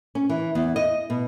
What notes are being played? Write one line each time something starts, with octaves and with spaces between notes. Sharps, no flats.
C#4
E3
E2
D#5
B2